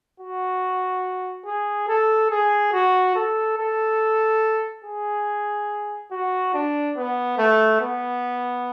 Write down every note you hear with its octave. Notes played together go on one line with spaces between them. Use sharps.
F#4
G#4
A4
G#4
F#4
A4
A4
G#4
F#4
D4
B3
A3
B3